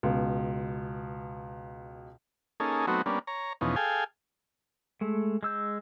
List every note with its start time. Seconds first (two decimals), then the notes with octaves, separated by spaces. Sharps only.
0.03 C#2 B2
2.60 A#3 C#4 D#4 G#4 A4
2.87 F#3 A3 B3 C4 D#4 F#4
3.06 G3 A#3 B3 C#4 D4
3.27 C#5 A#5
3.61 E2 B2 F3 C#4 D#4
3.76 G#4 A4 F5 G5 G#5
5.01 G#3 A3
5.43 G#3 E6 G6